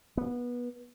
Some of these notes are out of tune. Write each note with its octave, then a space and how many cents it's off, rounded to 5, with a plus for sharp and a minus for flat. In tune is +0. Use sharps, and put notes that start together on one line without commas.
B3 -20